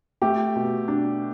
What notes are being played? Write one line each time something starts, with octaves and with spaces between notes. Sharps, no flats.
A3 G4
B2
D4